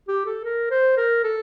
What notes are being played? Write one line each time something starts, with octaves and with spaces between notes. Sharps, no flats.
G4
A4
A#4
C5
A#4
A4